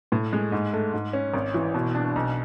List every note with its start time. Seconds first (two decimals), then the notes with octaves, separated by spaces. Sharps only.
0.12 A2
0.33 G#3
0.52 G#2
0.73 A3
0.94 G#2
1.13 C#4
1.34 G#1
1.54 E3
1.74 B2
1.95 D4
2.16 B1